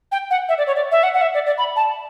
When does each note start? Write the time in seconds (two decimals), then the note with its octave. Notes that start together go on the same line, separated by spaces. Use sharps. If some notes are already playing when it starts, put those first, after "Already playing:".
0.12 G5
0.31 F#5
0.49 E5
0.58 D5
0.67 C#5
0.76 D5
0.91 E5
1.03 F#5
1.14 F#5
1.21 E5
1.34 D5
1.46 D5
1.58 B5
1.76 A5